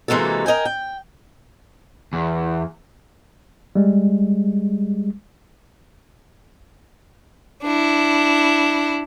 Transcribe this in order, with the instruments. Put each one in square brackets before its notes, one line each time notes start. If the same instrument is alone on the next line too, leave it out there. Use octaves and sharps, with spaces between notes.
[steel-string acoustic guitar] C3 E3 G#3 A#3 F#4 A4
A#4 D#5 G5 G#5
G5
[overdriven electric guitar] E2
[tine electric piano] G3 G#3
[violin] D4 E4